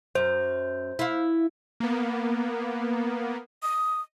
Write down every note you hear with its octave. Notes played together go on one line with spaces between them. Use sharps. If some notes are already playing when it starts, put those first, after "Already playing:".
F#2 C5
E4 F5
A#3 B3
D#6